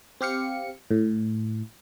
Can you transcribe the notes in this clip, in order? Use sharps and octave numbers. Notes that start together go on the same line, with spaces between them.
C4 G4 F5 C#7
A2